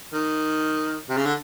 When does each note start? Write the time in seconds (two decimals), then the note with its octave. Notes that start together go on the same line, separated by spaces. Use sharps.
0.13 D#3
1.09 C3
1.17 C#3
1.26 D3